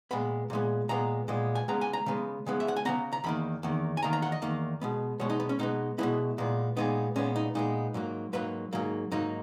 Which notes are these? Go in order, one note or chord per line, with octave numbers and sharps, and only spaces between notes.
A#2 G#3 B3 B5
A#2 G#3 B3
A#2 G#3 B3 A#5
A#2 G#3 B3
G#5
C#3 G#3 B3 A#5
G#5
A#5
C#3 G#3 B3
C#3 G#3 B3
E5
F#5
G#5
C#3 G#3 B3 A#5
A#5
E2 D#3 A#3 B5
E2 D#3 A#3
G#5
E2 D#3 A#3 A#5
A#5
F#5
D#5
E2 D#3 A#3
B2 G#3 B3
B2 G#3 B3 C#5
D#4
B3
C#4
B2 G#3 B3 D#4
B2 G#3 B3 E4
A#2 G#3 B3
A#2 G#3 B3 D#4
A#2 G#3 B3 C#4
D#4
A#2 G#3 B3 D#4
G#2 F#3 A#3
G#2 F#3 A#3 B4
G#2 F#3 A#3
G#2 F#3 A#3 D#4